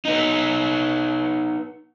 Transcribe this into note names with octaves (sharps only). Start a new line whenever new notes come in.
B3 D#4